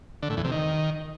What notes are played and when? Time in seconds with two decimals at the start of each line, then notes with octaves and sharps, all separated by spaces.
0.23 D3
0.30 A2
0.37 E2
0.44 C3
0.52 D#3